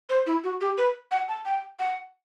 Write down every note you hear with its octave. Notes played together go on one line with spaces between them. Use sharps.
C5
E4
F#4
G4
B4
F#5
A5
G5
F#5